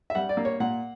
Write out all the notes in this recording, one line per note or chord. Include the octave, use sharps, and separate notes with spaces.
E5
G3 F#5
D5
A#3
C#5
A#2 F#5